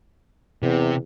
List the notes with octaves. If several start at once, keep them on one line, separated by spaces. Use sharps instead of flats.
E2 C3